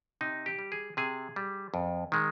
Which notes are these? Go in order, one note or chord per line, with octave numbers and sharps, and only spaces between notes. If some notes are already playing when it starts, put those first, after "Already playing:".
C3 D#4
G4
G3
G#4
C3 G#4
G3
F2
D#3 G#3